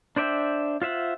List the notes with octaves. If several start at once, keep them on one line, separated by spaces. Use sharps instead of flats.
D4 C5 D5 E5 G5
F4 C5 E5 F#5